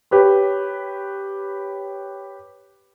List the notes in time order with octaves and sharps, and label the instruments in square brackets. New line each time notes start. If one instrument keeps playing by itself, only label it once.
[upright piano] G4 B4 C#5